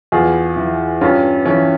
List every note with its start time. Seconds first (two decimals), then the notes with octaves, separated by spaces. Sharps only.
0.12 E2 F4 G#4
0.56 E3
1.01 G2 C#4 F4
1.46 E3 C#4